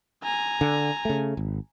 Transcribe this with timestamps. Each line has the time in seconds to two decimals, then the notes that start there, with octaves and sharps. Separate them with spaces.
0.23 G#5 A#5
0.61 D3
1.05 C#3 A3
1.37 G#1